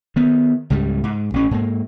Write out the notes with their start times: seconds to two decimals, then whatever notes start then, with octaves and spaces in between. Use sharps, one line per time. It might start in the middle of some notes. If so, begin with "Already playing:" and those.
0.16 D#3 B3
0.70 C#2 G#2 C#3 G3
1.04 G#2
1.34 A1 C#4
1.51 G#2 A#3